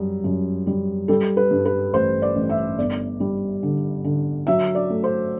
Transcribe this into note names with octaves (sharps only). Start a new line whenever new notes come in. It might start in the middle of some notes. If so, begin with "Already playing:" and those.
Already playing: F#2 G3
F#2
G3
G3 A4
B4
G2
B4
A1 C5
D5
A1
E5
G1 D5
G3
D3
D3
F#3 E5
D5
A3
C5